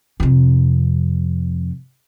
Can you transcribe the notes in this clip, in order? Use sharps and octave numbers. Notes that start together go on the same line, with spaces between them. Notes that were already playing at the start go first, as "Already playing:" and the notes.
F2 C3